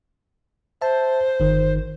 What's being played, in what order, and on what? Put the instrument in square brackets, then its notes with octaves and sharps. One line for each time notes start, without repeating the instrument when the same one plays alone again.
[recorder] C5 [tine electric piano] E5 A5
[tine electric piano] G1 D#3